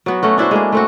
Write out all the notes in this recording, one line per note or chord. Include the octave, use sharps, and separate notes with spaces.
F#3 B3 F#4
A3 C#4 F#4
D4 E4 F#4 C5
G#3 A#3 G#4
A3 C4 F#4